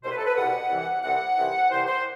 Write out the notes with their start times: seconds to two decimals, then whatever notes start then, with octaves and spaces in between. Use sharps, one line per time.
0.03 C2 B2 C5
0.11 B4
0.17 A4
0.26 B4
0.36 C2 B2 F#5
0.70 C2 C3 E3
1.03 C2 C3 E3 F#5
1.37 C2 C3 E3
1.70 C2 C3 E3 C5
1.86 C5